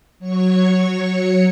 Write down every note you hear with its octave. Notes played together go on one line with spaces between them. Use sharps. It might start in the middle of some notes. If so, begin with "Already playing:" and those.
F#3 C#5 C#6